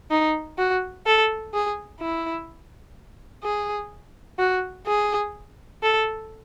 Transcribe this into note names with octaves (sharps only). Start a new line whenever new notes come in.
D#4
F#4
A4
G#4
E4
G#4
F#4
G#4
A4